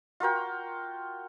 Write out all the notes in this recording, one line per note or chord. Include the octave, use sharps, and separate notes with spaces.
F4 F#4 A#4 G5